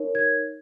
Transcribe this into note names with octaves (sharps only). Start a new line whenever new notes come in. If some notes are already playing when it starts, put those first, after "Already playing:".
Already playing: D#4 A#4 C#5
G#6